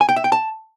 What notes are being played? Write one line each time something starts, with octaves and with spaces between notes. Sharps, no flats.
G#5
G5
E5
G5
A5